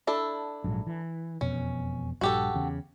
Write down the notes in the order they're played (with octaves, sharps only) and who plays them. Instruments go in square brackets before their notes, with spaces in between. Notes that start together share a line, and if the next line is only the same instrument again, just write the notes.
[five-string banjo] D4 E4 A4
[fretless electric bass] A#1 G#2 F#3
E3
[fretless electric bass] E1 F2 B2 [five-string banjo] C#4
[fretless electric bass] A#1 G2 [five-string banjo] F#4 G4 A4
[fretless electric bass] E2 C#3